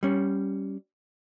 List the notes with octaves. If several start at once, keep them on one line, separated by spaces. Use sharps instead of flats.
G3 C#4